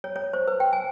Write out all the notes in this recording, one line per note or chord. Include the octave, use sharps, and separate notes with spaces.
C#5
C#5
C5
B4
G5
G#5